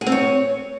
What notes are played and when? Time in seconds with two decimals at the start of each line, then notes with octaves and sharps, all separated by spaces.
0.01 G#4
0.07 C4
0.12 C#5